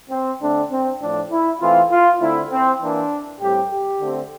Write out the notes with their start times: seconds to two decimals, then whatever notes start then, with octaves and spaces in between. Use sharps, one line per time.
0.10 C4
0.40 D3 A3 C4 D4
0.70 C4
1.01 A2 F3 A3 D4
1.31 E4
1.60 E3 A3 C4 F4
1.91 F4
2.20 D3 A3 C4 E4
2.50 C4
2.80 E3 A#3 D4
3.40 A2 G3 C4 G4
3.70 G4
4.00 D3 A3 C4